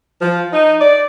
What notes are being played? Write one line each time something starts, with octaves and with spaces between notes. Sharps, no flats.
F3
D#4
D5